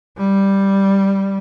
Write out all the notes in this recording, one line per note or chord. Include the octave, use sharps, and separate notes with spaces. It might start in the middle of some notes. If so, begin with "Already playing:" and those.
G3